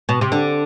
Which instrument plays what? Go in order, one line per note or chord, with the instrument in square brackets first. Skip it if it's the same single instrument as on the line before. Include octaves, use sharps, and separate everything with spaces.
[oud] B2
C3
D3